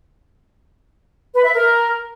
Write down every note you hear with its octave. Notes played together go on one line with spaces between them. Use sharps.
B4
E5
A#4